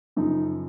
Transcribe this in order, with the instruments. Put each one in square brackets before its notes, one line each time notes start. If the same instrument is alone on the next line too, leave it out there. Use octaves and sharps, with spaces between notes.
[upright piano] F#2 C#3 F3 D#4